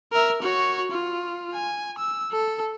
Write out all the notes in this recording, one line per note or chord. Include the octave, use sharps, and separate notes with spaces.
A#4 E5
F#4 C#5
F4
G#5
E6
A4